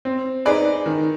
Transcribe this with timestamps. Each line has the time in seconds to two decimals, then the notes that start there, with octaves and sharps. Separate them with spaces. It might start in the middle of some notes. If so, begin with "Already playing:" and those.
0.05 C4
0.45 D#4 G#4 B4 D5
0.86 D#3